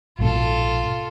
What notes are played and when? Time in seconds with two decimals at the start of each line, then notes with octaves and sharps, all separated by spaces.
0.19 A#1 G#2 B2 F4 A4